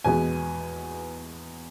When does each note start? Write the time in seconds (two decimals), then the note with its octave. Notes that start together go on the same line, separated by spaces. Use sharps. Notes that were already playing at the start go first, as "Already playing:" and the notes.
0.04 E2 B2 G#3 B3 G#5